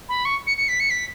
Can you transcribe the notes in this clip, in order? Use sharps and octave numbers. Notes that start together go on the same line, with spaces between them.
B5
C#6
C#7
C#7
B6
C#7
B6